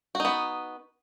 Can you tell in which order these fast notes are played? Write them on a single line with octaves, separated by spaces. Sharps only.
F#4 D#4 B3